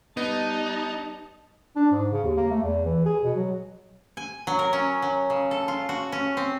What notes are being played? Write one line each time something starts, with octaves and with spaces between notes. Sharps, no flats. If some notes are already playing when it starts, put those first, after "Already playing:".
G3 B3 D#4 D#5 A5
D4
G#2
C#3
D#2
A#3
A3
E2
E3
G#4
B2
F#3
G#5
F#3
A#4
C#4
F#3
C#3
A4
F4
F#4
C#4
C4